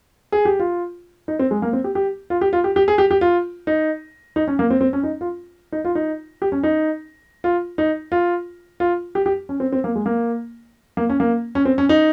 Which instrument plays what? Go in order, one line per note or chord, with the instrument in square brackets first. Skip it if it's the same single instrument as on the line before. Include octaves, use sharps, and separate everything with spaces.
[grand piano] G#4
G4
F4
D#4
C4
G#3
A#3
C4
G4
G4
F4
G4
F4
G4
G4
G#4
G4
G4
F4
D#4
D#4
C#4
A#3
C4
C4
C#4
D#4
F4
D#4
F4
D#4
G4
C#4
D#4
F4
D#4
F4
F4
G4
G4
C#4
C4
C4
A#3
G#3
A#3
A#3
C#4
A#3
C#4
C4
C#4
D#4